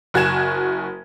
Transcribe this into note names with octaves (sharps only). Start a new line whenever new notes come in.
F#1 F#4 G#5 G#6 E7